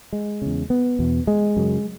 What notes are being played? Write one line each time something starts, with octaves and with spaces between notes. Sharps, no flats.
G#3
E2 C#3
B3
E2 B2
G#3
F#2 C#3